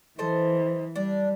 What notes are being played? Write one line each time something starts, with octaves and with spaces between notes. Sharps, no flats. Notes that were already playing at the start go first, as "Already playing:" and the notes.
E3 A4 C5 D#5
G3 D4